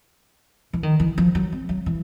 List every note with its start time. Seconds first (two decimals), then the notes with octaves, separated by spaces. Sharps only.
0.73 E3
0.83 D#3
1.00 E3
1.18 F3
1.35 F#3
1.52 C4
1.69 F#3
1.86 E3